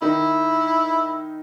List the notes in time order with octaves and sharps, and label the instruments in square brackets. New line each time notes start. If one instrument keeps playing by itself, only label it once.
[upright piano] D#3 D#4 [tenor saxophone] E4